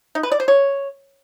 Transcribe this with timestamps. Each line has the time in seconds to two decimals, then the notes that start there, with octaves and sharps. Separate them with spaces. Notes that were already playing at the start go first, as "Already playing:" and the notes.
0.15 D#4
0.23 B4
0.32 D5
0.40 C5
0.48 C#5